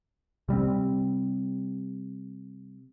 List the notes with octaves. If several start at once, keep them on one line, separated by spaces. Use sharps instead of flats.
C3 G3 A3 C4